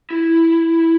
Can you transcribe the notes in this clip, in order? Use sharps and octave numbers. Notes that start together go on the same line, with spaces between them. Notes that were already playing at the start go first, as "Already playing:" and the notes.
E4